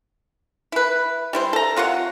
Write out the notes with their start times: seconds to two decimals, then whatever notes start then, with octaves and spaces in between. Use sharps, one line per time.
0.72 E4 B4
1.33 G3 E4 C5
1.53 A4 A#5
1.77 C3 F4 C#5 F#5